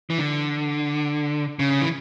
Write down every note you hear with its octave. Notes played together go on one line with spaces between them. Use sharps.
E3
D3
C#3
E3